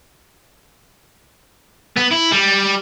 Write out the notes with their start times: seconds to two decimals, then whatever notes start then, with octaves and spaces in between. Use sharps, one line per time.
1.97 B3
2.11 E4
2.32 G3